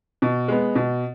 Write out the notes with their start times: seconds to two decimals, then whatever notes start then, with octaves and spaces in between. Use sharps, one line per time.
0.22 B2
0.48 G#3 B3
0.75 B2